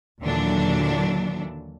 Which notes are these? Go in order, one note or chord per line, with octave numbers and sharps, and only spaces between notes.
D#2 A#2 D3 E3 F#3 D4